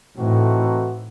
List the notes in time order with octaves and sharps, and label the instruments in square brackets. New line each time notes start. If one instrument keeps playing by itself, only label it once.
[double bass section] A2 [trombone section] E3 A3 C4 D#4 F#4